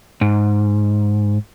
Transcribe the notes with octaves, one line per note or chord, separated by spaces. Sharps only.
G#2